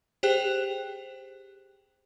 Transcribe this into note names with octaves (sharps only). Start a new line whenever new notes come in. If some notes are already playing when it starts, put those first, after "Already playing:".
G4 G#4 C5 G5 F#6